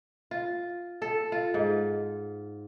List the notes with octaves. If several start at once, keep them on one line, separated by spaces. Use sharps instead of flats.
F4
A4
F4
G#2